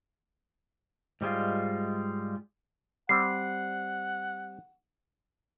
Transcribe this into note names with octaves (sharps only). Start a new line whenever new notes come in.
G#2 G3 G#3 F4
G3 C4 F#5 C7